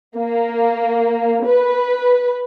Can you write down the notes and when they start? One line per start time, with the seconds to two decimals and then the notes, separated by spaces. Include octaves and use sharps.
0.18 A#3
1.46 B4